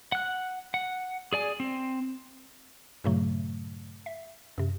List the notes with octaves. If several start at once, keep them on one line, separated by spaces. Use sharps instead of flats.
F#5 F#6
F#5
G#4 D5 G#5
C4
G2 A#2 C#3 F#3 A3
E5
F#2 C3